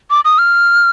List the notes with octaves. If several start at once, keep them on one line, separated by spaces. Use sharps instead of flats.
D6
D#6
F6